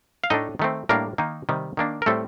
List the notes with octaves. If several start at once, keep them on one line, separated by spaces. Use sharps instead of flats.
F5
A2 A3 D4 D#4 D#5
D#3 A3 C4
A2 G3 A#3 D4 A#4
D#3 A#3 D#4
C3 D#3 G3
D#3 A#3 D4
A#4
A2 G3 A3 C4 A4